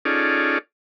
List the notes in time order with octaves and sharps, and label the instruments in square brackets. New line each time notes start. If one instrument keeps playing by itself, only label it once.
[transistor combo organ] C#4 D#4 F4 G#4 A4 D5